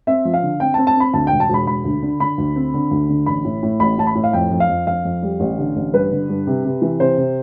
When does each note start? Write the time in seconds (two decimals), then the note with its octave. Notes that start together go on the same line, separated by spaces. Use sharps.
0.07 C4 E5
0.25 F3
0.34 F5
0.42 D3
0.60 C4 G5
0.74 A5
0.78 C4
0.87 A5
0.96 C4 B5
1.14 D2 A5
1.27 E1 G5
1.40 A5
1.49 E1 B5
1.67 E1 B5
1.84 D2
2.02 D3
2.20 D3 B5
2.38 D2
2.56 C4
2.74 D3
2.91 D2
3.09 D3
3.26 A1 B5
3.44 A2
3.63 A2
3.80 A1 B5
3.98 A2 A5
4.07 B5
4.15 A2
4.24 F5
4.33 F2 G5
4.52 F2
4.60 F5
4.69 F2
4.87 F2 F5
5.05 F2
5.22 G3
5.40 A1
5.58 D3
5.76 A1
5.93 G2 B4
6.11 D3
6.29 G2
6.47 C3
6.65 C3
6.82 E3
7.00 C3 C5
7.18 C3